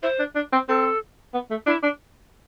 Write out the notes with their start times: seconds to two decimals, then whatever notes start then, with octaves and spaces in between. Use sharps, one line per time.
0.03 E4 C5
0.19 D4
0.35 D4
0.52 C4
0.69 C4 A4
1.34 B3
1.50 A3
1.66 D4 E4
1.83 D4